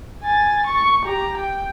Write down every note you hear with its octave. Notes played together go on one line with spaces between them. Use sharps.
G#5 A6
C#6
G4 A#5
G5